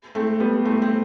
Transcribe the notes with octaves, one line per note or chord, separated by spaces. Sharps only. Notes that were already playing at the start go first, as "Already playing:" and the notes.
A3 C4
G3 B3
A3 C4
C4